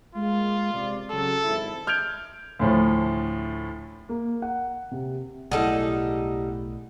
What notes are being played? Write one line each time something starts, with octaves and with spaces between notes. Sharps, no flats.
G#3 A#3 F4
C3 D5
C#3 F#3 F#4 A4
G#1 E4
F6 G6 G#6 D7 F7
D2 A2 F3
A#3
F#5
C3
B1 A2 G3 D#4 E4 G#4 A4 F#5